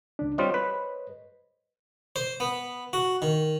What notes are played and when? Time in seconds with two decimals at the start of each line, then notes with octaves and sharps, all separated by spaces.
0.19 C#2 D4
0.38 G3 C4 F4 C5 C#5 D#5
0.54 B4
2.16 C5
2.40 B3
2.93 F#4
3.22 D#3